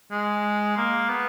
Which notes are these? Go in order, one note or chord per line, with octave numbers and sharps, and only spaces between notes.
G#3
A#3
B3